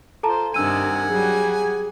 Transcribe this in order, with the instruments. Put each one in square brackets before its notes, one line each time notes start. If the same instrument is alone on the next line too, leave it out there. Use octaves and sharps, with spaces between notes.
[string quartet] F4 C5 [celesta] A4 A5 A#5
[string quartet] G2 C3 D#3 [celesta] D4 E6 D#7 [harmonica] F#5 G#5
[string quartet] F#3 G3 [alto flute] G#4